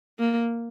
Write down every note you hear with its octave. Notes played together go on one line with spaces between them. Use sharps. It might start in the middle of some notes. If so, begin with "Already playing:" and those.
A#3